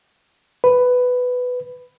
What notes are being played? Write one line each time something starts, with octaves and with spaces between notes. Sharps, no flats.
B4